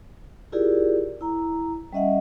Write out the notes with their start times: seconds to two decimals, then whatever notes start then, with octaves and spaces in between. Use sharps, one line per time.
0.52 E4 F4 G4 G#4 A#4 D5
1.21 E4 A#5
1.93 G3 C#4 D#5 E5 F#5